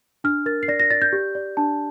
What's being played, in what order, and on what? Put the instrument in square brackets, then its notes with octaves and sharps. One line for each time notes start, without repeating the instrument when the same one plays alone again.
[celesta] D4 F6
A#4 A6
C7
D5 A#6
A#6
D5 A6
G6
G4
D5
D4 A5